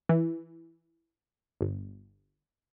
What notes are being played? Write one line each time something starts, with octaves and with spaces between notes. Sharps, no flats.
E3
G1